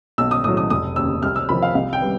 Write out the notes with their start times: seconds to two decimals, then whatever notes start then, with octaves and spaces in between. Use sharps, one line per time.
0.18 B1 E6
0.31 D#6
0.44 A2 F#3 D#6
0.57 D#6
0.70 F1 D#6
0.96 D#2 C#3 E6
1.23 C2 F6
1.36 E6
1.48 C3 F3 A#3 B5
1.63 F5
1.75 C2 F5
1.93 G5
2.01 G3 B3